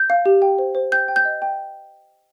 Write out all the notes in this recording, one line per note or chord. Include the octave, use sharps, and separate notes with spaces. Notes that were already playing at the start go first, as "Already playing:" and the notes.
Already playing: G6
F5
G4
G5
C5
C5
G5 G6
G5
G6
D#5
G5